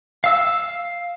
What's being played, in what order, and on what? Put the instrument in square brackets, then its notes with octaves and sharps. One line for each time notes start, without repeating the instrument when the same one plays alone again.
[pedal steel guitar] F5 E6